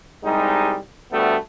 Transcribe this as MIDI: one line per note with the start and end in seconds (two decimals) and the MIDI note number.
0.24 0.78 36
0.24 0.78 55
0.24 0.78 56
0.24 0.78 63
1.12 1.36 38
1.12 1.36 55
1.12 1.36 57
1.12 1.36 59
1.12 1.36 69